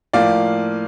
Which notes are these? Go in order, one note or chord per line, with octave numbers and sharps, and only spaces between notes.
A2 F3 A#3 D5 F5